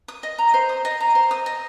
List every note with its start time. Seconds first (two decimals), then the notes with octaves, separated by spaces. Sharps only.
0.08 D#6
0.23 D#5
0.38 A#5
0.54 C5
0.69 D#6
0.85 D#5
1.01 A#5
1.15 C5
1.31 D#6
1.46 D#5